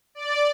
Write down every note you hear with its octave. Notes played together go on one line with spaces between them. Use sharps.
D5